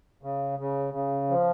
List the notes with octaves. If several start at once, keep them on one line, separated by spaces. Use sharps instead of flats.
C#3
C#3
C#3
F3